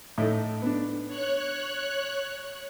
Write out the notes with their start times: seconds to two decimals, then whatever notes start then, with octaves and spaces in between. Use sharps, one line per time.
0.18 A2 D#4 A4
0.62 B3 D4
1.07 C#5 F#6